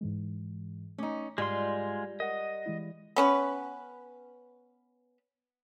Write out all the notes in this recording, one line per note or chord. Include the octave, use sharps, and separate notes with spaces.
G#2 E3 G#3
A3 C#4 D#4 D6
G#2 G3 G#3 F4 C6
A#4 D#5 F#5 A#6
E3 G#3 E4
B3 C#4 B4